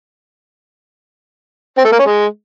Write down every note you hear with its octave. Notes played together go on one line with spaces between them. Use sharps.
C4
A3
A#3
C#4
G#3